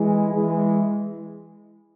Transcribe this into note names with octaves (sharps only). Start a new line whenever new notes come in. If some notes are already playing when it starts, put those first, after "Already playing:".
Already playing: E3 G#3
E3 G#3